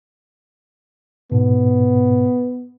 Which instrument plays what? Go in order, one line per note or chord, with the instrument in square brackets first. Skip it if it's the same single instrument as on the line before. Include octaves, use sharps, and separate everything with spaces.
[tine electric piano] G#2 B2 [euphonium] B3